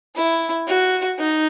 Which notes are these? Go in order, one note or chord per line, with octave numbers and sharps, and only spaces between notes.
E4
F#4
D#4